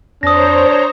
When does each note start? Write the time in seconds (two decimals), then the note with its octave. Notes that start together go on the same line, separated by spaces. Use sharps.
0.23 F2 D4 C5 C#5 A#5 D#6 A#6